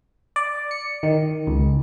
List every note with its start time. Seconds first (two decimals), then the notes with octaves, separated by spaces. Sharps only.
0.36 D5
0.71 C#7
1.03 D#3
1.47 C#2